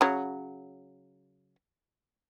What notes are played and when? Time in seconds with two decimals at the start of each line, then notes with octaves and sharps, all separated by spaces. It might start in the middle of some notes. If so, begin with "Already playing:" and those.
0.01 C#3 F#3